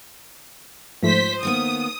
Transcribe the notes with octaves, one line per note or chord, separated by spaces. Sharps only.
G#2 F3 A3 C5 B6
D#3 A#3 B3 D#6